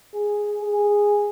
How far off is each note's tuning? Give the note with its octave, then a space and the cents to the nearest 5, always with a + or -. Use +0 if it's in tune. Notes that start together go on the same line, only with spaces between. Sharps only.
G#4 +0
G#4 -10